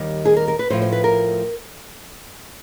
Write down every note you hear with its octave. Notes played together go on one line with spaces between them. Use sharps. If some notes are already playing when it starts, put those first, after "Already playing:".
Already playing: D#2 D#3 G3
G#4
A#4
A#4
B4
A2 F3 C5
C5
B4
A#4